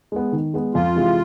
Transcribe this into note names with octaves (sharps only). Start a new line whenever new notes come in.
G#3 B3
D#3
G#3 B3
F2 F4
C3 E3 G#3